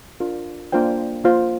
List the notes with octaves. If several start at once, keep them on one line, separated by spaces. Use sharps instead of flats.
D4 F4 A#4
A#3 D4 F4 C5 G5
A#3 F4 C5